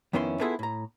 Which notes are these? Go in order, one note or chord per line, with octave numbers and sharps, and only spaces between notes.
F2 D#3 B3 C#4 E4 C6
B3 E4 F4 G#4 A4 B4
A2 A#5